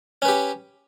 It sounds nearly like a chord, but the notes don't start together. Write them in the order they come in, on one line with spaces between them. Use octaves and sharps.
C#4 B4 G4